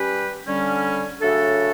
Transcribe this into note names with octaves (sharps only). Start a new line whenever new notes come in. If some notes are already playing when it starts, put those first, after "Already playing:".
Already playing: G3 C#4 G4 B4
D3 G3 C#4
C#3 F#3 A3 D4 A4